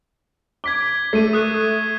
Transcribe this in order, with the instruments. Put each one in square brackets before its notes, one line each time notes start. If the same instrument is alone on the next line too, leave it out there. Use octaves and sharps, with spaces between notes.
[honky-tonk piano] D6 [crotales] G#6 B6 G7
[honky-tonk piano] A3 [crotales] C7 D#7
[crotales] D#6 F#6